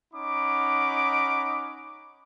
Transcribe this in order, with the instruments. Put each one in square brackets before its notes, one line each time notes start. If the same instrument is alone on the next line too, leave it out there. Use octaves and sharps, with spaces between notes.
[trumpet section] C#4 D#4 F#5 B5 D6